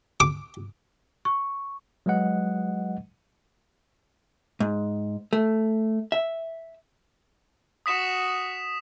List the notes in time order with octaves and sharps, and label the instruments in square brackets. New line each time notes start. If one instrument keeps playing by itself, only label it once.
[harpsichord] D6
[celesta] C#6
[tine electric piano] F#3 G#3 B4 D#5 F#5
[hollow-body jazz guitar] G#2
A3
E5
[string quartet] F#4 [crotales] D#6 B6 E7